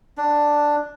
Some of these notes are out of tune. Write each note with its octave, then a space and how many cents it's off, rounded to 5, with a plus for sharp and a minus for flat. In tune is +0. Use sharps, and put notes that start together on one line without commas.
D4 +5